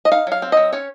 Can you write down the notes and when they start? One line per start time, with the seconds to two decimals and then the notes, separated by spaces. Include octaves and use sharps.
0.05 D#5
0.12 D#4 F5
0.27 F#3 F5
0.42 C4
0.52 F#3 D#5
0.73 C#4 C#5